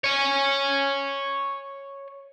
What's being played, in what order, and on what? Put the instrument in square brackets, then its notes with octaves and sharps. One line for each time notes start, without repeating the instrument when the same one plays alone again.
[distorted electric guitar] C#5 G#5